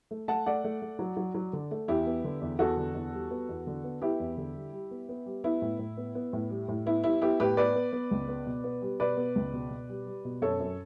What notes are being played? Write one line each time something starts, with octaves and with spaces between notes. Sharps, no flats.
A3
A3 F#5 A5
A3 D5 F#5
A3
A3
F#3
F#3
F#3
D3
A3
E2 E4 G4
B3
D3
E2
E2 F#4 A4
D3
E2
G3
B3
E2
D3
B3
B3 E4 G4
E2
D3
G3
G3
B3
B3
G3
B3 E4
A2
A2
B3
B3
A2
G3
A2
B3 E4
G3 E4
B3 E4 G4
A2 G4 B4
B3 B4 D5
B3
B3
C#2
B3
B2
B3
G3
B2 B4 D5
B3
C#2
B2
B2
G3
G3
B2
F#2 A4 C#5
F#2